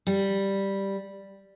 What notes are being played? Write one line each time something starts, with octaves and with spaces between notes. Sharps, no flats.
G3